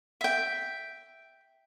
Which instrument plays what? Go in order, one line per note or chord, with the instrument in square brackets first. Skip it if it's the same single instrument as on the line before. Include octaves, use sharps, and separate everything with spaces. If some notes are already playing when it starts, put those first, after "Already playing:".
[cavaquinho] E5 G5